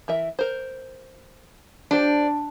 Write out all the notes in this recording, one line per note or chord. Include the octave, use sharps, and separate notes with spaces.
E3 A#4 E5
A#4 C5
D4 F4 G4 C5